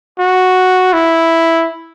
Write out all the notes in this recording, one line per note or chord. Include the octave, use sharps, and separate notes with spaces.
F#4
E4